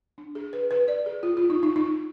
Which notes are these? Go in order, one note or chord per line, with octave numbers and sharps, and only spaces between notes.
D4
G#4
B4
B4
D5
G#4
F4
F4
D#4
D#4
D#4